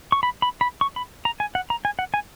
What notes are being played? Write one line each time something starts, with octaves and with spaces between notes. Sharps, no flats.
C#6
B5
B5
B5
C#6
B5
A#5
G#5
F#5
A#5
G#5
F#5
G#5